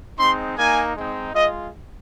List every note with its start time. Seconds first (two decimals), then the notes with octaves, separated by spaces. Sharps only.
0.18 G#3 C4 D#4 C6
0.57 A#3 D#4 G#5
0.96 G#3 C4 D#4
1.34 G#3 F4 D#5